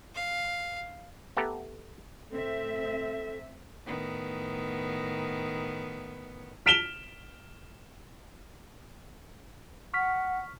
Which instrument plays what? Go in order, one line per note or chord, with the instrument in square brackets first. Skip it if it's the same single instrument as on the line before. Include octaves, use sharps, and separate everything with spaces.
[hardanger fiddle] F5
[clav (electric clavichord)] A3 B3 G4 A4 A#5
[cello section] A2 C4 E5 [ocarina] A4
[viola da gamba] A2 D#3 B3
[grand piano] F6 B6 D7 E7 F7 G7
[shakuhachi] F#5 [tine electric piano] C#6 F6 B6